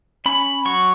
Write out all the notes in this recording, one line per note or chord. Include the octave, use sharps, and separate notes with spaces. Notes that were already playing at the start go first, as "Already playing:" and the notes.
C#4 B5
F#3 C#6